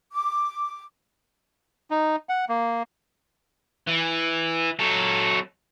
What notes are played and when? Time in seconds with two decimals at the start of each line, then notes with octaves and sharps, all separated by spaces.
0.12 D6
1.91 D#4
2.29 F#5
2.49 A#3
3.87 E3
4.79 F#3 A4